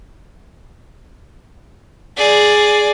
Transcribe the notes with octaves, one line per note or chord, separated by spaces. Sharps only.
G#4 D5